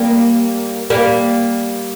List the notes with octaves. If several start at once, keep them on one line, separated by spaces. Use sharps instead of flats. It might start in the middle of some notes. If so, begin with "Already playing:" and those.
Already playing: G3 A#3
G3 A#3